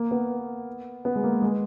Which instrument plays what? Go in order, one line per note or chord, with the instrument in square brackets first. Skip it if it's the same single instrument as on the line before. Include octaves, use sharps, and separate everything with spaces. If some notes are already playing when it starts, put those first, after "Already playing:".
Already playing: [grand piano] A#3
B3
B3
G#3
A#3
G#3